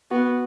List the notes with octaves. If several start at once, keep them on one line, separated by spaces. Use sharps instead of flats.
B3 F#4